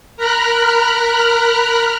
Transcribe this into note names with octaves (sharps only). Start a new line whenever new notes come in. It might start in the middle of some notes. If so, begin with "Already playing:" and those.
A#4 A#5 B5 F6 F#6